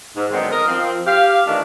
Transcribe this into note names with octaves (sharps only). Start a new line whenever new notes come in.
G#2
D3 D#3 F#3 G#3 B3 C4
A#4 D#5
F3 C4
G4 F5
A#2 D#3 E3 A3 D4